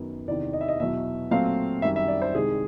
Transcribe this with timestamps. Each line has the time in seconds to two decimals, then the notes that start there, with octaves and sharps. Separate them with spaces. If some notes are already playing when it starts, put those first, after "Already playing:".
Already playing: F#2 D#3 F#3 B3
0.27 E2 C3 D#3 D5
0.53 D#5
0.61 E5
0.68 D#5
0.80 E2 B2 F#3 E5
1.31 A#2 F#3 A3 C4 F5
1.82 F#2 D#3 G3 E5
1.96 E5
2.08 D5
2.22 C5
2.34 C2 C3 D#3 G#3 G#4